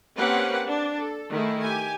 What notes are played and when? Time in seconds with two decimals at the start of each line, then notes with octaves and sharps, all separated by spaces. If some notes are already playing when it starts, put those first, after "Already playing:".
0.16 A#3 C4 C#4 G4 B4 F#5
0.66 D4
0.98 A4
1.32 D#3 A3 E4 G#4
1.63 G4 G#5